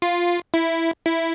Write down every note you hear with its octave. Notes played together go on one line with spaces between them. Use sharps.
F4
E4
E4